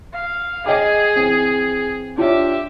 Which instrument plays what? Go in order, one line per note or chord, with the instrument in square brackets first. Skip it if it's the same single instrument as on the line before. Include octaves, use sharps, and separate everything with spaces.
[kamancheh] F5
[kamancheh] G#4 [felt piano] D#5 G5 D6
[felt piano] E3 C4
[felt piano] D4 F4 C#5 [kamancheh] G4 E5